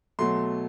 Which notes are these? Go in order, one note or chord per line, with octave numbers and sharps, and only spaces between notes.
B2 F#3 A3 C6